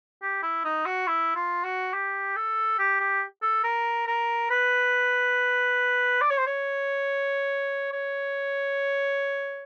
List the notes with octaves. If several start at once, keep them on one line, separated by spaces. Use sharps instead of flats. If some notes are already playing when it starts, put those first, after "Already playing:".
G4
E4
D#4
F#4
E4
F4
F#4
G4
A4
G4
G4
A4
A#4
A#4
B4
D5
C#5
C5
C#5
C#5